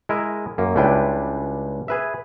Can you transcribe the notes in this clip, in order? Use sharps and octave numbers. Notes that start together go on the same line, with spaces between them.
G#3 E4 A#4 D#5 E5
F#2 A#3
C#2 G3 D4 E4 B4 G5
G#4 B4 E5